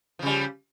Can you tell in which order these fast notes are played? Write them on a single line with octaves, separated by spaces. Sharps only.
F3 C#3 G3